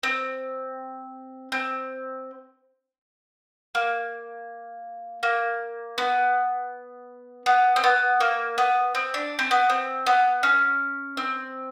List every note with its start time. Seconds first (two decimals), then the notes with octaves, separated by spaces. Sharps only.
0.03 C4
1.52 C4
3.75 A#3
5.23 A#3
5.98 B3
7.46 B3
7.76 C4
7.84 B3
8.20 A#3
8.58 B3
8.95 C4
9.14 D4
9.39 C4
9.51 B3
9.70 C4
10.06 B3
10.43 C#4
11.17 C4